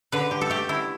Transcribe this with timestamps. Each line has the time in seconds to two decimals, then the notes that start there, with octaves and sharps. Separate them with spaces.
0.12 D3 B4
0.31 D3 G4
0.41 A4
0.50 A3 G4
0.69 D3 E4